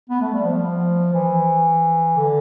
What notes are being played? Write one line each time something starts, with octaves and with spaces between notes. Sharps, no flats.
B3
A3
G3
F3
E3
D3